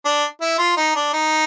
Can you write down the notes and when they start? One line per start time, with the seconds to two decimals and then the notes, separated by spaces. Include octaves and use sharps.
0.05 D4
0.41 E4
0.58 F4
0.77 D#4
0.95 D4
1.13 D#4